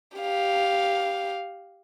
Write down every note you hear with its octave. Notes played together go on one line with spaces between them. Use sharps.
G4 F5